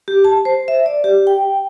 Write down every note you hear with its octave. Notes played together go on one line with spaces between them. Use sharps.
G4
A5
C5
E5
D5
G4
G5